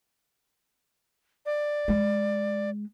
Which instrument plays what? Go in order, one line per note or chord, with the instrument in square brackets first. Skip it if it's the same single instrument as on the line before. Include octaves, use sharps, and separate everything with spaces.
[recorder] D5
[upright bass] G#3